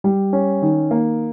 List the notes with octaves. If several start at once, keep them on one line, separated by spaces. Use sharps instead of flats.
G3
C#4
D#3
A#3